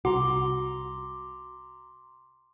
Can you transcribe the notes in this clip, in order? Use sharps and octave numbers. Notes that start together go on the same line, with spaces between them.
C2 F#4 A#5 C6 D6